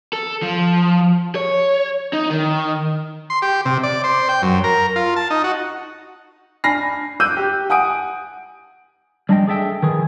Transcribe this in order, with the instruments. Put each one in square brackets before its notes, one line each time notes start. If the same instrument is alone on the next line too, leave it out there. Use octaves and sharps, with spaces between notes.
[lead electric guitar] A4
F3
C#5
D#4
D#3
[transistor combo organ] C6
G4
C3
D5
C5
G5
F#2
A#4
F4
A5
D#4
F#4
[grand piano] D4 G#5 B5 F6 A#6 C7
D6 E6 F#6 G6 D#7
G4
F#5 G#5 D#6 D7
[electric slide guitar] G3 D4 D#5 G5
G#4 A4 E5 G5
D#3 E3 G#4